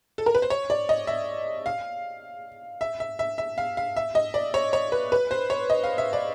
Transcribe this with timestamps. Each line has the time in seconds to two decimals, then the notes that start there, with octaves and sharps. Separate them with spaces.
0.18 A4
0.26 A#4
0.35 B4
0.42 C5
0.50 C#5
0.70 D5
0.89 D#5
1.07 E5
1.66 F5
2.81 E5
3.00 E5
3.19 E5
3.38 E5
3.58 F5
3.77 F5
3.96 E5
4.15 D#5
4.34 D5
4.54 C#5
4.73 C#5
4.92 B4
5.12 B4
5.31 C5
5.50 C#5
5.70 D#5
5.84 F5
5.98 E5
6.13 D5